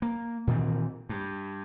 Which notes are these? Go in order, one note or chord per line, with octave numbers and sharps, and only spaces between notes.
A#3
A#2 D#3 E3 C4
G2